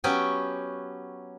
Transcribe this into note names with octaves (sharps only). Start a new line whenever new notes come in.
F#3 B3 C#4 G4 G5 G#5